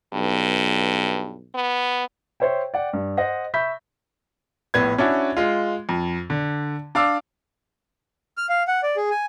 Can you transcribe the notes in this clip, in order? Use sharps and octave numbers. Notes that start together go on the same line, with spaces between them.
B1 G2
B3
C5 C#5 E5 G5
D5 F#5 G5
G2
C5 D#5 F#5 A#6
E5 B5 C#6 G6 B6
A#1 A2 B3 G#6
C#4 D4 E4 F#4
G#3 F4
F2
D3
D4 F5 D6 E6
F6
F5
F#5
D5
G#4
G#5